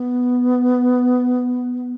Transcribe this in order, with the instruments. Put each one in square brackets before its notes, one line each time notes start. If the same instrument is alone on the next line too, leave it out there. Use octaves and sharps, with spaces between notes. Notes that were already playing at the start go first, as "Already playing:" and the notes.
Already playing: [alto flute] B3